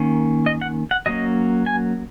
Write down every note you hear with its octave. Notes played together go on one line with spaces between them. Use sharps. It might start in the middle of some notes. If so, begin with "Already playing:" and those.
Already playing: D#3 A#3 C#4
D#5
F#5
F#5
F#3 A#3 C#4 D#5
G#5